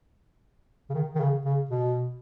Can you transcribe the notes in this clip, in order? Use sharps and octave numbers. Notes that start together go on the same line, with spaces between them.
C#3
D#3
D#3
C#3
C#3
B2